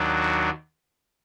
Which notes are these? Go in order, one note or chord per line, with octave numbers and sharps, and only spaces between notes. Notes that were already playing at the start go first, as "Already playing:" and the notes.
Already playing: D#2 D#3 F#3 D4 F#4